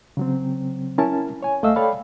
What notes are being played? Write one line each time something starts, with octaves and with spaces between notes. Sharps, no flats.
C#3 F#3 C4
C#4 E4 A#4 G#5 A5
C#5 G#5
C#2 A3 D#5 F5 E6
A4 C#5 D5 F5 G5 B5